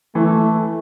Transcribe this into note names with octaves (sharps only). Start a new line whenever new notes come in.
E3 A3